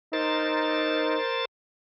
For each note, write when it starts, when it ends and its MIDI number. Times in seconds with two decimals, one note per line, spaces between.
0.13 1.17 63
0.13 1.45 70
0.13 1.45 72
0.13 1.45 93